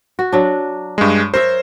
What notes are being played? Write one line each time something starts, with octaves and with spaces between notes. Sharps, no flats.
F#4
F#3 D4
G2 G#3
A#4 C5 C#5 E5